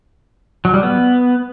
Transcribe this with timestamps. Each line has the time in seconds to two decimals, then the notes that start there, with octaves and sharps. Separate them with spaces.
0.65 F#3
0.74 G3
0.83 B3